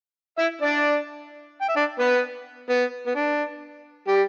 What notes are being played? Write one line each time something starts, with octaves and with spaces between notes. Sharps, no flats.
E4 E5
D4 D5
G5
E5
D4 D5
B3 B4
B3
B3
D4
G3 G4